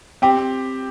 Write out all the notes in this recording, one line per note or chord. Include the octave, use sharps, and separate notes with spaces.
C4 G4